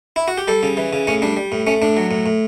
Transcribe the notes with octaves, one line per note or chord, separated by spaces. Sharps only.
E4
F#4
G4
G3 A4
C#3
E3
C#3
A2 C#4
G3 D4
G3
A2
A3 C#4
A2 D4
F#3
A2
A2